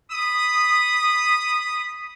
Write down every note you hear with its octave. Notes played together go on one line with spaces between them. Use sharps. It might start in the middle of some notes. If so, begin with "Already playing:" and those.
B5 D#6